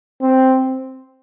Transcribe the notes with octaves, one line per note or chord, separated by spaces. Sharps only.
C4